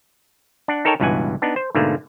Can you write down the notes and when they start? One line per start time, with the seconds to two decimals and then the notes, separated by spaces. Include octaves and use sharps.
0.68 D4 F#5
0.85 D#4 A4 A#4 C#5 G5 A5
1.00 C#2 G2 B2 E3 F#5 G#5
1.42 B3 D4 D#4
1.56 C5
1.75 G#2 B2 D3 A3 A#3